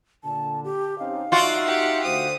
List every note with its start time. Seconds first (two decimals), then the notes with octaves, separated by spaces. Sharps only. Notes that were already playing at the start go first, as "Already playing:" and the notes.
0.24 A#2 D3 A5
0.64 G4
0.99 C4 C#4 D#4 F5
1.32 D#4 F4 F#4 D5 E5
1.66 G4 F#5 G5
2.04 D2 C5 D#6